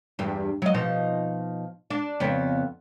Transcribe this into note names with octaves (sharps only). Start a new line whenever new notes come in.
E2 G2
F#3 D#5
B2 F3 D#4
D4
F2 C#3 B3